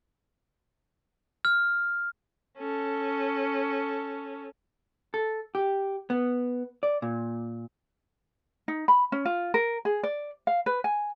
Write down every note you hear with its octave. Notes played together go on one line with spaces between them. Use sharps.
F6
C#4 A4
A4
G4
B3
D5
A#2
D#4
B5
C#4
F4
A#4
G#4
D5
F5
B4
G#5